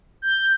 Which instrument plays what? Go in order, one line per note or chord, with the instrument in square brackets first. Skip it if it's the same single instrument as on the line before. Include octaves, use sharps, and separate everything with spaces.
[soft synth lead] G6